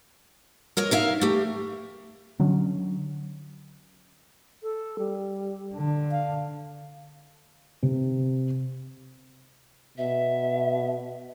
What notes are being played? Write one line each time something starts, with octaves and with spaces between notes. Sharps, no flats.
A#4 C#5 D#5
D#4 A#4 E5 F5
A3 G4
D3 F#3 C#4
A4
G3
D3
F5
C3
B2 E5